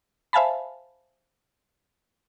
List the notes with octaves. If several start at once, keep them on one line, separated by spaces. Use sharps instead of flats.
C5 E5 F5 G#5 A5 B5